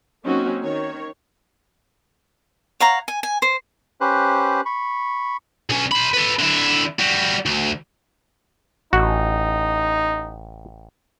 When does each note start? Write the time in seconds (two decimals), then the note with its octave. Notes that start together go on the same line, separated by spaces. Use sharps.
0.25 F#3 A#3 C4 C#4 D#4 F#4
0.62 D#3 C#5
2.80 C#5 F5 F#5 A#5
3.08 G#5
3.23 G#5
3.42 C5
4.01 C#4 G4 B4 C5 F#6
4.65 B5 C#6
5.70 B1 C#4
5.91 C5 B5
6.14 A4 B4
6.39 D3 E4
6.99 G3 F#4
7.46 D2
8.93 A1 D#4 F#4